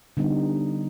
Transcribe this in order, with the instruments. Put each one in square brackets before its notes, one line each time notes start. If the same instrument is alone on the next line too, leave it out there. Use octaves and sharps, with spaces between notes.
[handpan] D3 G3 B3 D#4